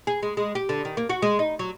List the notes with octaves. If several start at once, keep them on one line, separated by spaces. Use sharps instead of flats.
G#4
G#3
G#3
G4
D3
D#3
A#3
F#4
G#3
D#4
F#3